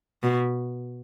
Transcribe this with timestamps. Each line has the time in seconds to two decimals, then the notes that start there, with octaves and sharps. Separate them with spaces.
0.23 B2